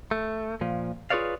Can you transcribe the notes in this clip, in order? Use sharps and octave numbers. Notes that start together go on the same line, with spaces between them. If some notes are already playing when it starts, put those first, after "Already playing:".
A3
A#2 F3
F4 G#4 B4 C#5 D5 F5